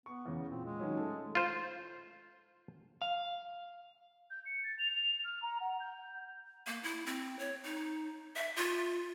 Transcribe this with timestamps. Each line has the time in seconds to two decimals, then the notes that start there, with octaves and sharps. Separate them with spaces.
0.06 B3 C#6
0.26 E2 C#3
0.51 A#2 C4
0.65 G#3
0.80 D#3 F#3 C#4
0.97 A3 A4
1.35 F4 C5
3.02 F5
4.30 G6
4.46 C#7
4.64 A6
4.79 F7
5.24 F6
5.42 A#5
5.61 F#5
5.80 G6
6.67 A#3
6.83 E4
7.06 C4
7.39 C#5
7.64 D#4
8.36 E5
8.56 F4